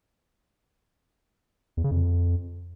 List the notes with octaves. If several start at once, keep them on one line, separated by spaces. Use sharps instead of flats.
E2
C#3
F2